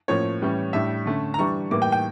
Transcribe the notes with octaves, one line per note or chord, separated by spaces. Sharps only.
A2 F3 A#3 C#4 C#5
A2 E3 G3 C#4
A2 G3 D4 E5
D3 A3 C#4
A#5
E3 G3 D4 C#6
A2 E3 G3 A#3 D6
G5
G5